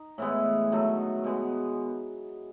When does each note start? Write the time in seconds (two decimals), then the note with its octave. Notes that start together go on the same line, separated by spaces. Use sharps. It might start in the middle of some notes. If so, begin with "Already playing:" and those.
Already playing: D#4
0.18 A2 E3 G#3 B3
0.72 D#3 F#3 A3
1.24 B2 G#3 B3